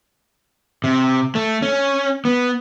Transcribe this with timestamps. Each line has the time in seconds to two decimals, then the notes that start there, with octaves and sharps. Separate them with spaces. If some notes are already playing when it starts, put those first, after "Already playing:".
0.84 C3
1.35 A3
1.62 C#4
2.25 B3